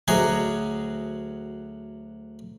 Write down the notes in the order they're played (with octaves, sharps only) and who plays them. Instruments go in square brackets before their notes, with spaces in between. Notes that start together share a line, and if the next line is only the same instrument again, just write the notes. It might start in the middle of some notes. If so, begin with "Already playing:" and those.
[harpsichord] D2 F#3 F#4 G#4 D#5